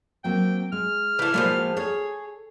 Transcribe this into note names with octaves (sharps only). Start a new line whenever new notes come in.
F#3 A#3 C4 G5
G#3 F6
E3 A3
A2 D#3 F3 G#3 A#3 F#4
G#4 A4 C#5